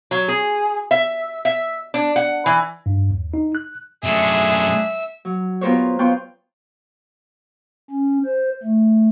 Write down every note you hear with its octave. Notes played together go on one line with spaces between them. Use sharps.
F#3
G#4
E5
E5
D4
F#5
E3
G2
D#2
D#4
F#6
F#2 G#3 A3 D4 G#4 E5
F#3
B3 F4 G4 A#4 C5 C#5
B3 F4 F5 G5 C6 C#6
C#4
C5
A3